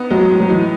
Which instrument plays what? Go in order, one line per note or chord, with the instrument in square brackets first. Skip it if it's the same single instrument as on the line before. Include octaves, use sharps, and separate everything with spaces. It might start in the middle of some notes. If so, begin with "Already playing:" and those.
Already playing: [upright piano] B3 D#4
[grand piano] F#3 [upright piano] G#3
[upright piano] A2
[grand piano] F#3
[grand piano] E3 [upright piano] D#4